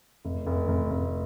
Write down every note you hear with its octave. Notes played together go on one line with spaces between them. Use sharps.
F1
F1
F1
F1